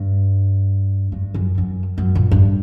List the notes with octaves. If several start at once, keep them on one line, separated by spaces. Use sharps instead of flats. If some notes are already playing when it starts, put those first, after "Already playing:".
Already playing: G2
G2
F#2
F#2
F#2
A#2
G2